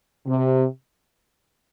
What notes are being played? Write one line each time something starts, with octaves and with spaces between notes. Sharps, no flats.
C3